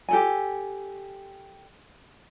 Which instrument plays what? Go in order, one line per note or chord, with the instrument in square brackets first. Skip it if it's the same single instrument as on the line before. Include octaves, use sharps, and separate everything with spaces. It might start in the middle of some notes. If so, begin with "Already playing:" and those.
[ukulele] G4 A4 G#5